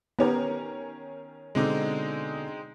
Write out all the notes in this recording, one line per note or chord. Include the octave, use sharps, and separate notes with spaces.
D#3 B3 C#4 G4 A#4
B2 D3 G#3 C4 D#4 D6